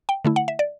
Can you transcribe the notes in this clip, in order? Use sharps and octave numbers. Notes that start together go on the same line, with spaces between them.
G5
D3 A3 E4
F#5
E5
D5